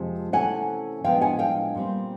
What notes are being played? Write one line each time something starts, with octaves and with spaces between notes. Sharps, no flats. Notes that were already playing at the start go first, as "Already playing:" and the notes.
Already playing: F2 C3 F3 G#3 A5
C3 E3 A3 C#4 F#5 G#5
A2 F3 G#3 B3 D4 F5 G5
F#5 G#5
F5 G5
A#2 G3 C4